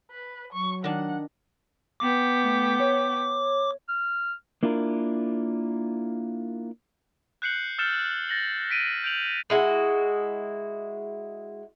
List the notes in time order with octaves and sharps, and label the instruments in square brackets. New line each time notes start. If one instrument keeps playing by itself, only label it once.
[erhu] B4
[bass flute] F#3 [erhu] C#6
[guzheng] D#3 D4 [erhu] F#5
[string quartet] B3 G5 [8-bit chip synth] D6
[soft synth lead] A3
C#5
[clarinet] F6
[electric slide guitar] A#3 D4 E4 F4 A#4
[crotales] F#6 G6 C7 C#7 F#7
E6 F6 G6 A6 C#7 E7
A6 A#6 F#7
B6 D7 D#7
G6 D7 F7 F#7
[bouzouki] G#3 E4 F#4